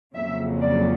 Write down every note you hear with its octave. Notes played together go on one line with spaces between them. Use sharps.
F2 C#3 F#3 A#3 E5
D5